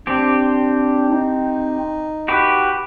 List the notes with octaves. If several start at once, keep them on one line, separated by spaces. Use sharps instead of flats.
C4 D4 G4
D#4
F#4 G4 B4